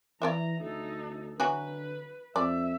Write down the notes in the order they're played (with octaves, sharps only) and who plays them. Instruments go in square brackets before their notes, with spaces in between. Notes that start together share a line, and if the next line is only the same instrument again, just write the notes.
[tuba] E3 [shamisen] E4 D5 E5 [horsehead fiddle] A#5
[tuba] D2 [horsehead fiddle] D#4 A4
[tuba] D3 [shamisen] E3 F#3 F#4 [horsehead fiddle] B4
[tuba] F2 [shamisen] D5 [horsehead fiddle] E5